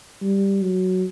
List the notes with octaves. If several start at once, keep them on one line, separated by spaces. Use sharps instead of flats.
G3
F#3